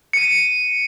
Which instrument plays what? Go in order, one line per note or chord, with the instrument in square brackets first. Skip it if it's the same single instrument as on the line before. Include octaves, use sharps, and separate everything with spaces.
[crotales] C#7 D#7